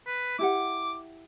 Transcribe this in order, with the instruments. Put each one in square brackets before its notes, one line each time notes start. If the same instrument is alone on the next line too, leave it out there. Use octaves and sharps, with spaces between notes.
[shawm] B4
[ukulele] E4 G4 F#5 [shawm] D6